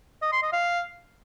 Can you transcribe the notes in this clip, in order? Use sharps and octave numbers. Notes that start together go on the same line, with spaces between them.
D#5
C6
D#5
F5